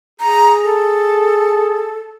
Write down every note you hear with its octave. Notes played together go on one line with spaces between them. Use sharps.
G#4 A#5
A4